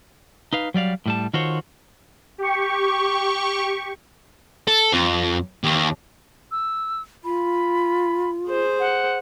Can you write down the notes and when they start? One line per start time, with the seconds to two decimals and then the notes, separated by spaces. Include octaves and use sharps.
0.53 D#4 B4 F5
0.74 F#3 G3 D5 F5
1.06 A2 G3 A5
1.34 D#3 F4 F#4 A4 C5 C#5
2.38 G4 C#6
4.68 A4
4.93 F2
5.64 D#2
6.51 E6
7.24 F4 B5
8.47 G#4 C5
8.80 F#5